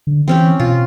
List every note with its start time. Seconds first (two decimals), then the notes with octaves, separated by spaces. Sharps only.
0.07 D3
0.28 E3 C4 C#4 G4
0.60 B2 F4